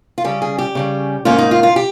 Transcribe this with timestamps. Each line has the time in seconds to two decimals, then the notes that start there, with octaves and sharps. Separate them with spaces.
0.18 F4
0.24 C#3 G3 C#4 G4
0.42 G#4
0.58 G4
0.75 C#3 G3 C#4
1.25 G#2 D#3 A#3 C#4 F4
1.38 D#4
1.51 F4
1.63 F4
1.76 G4